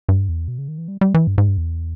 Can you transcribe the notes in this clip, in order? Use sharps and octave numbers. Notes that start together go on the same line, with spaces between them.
G2
E2
B2
C#3
D#3
E3
G3
G3
E3
G2
G#2
G2
E2